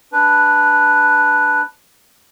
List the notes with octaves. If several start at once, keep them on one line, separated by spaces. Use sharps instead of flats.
D4 B4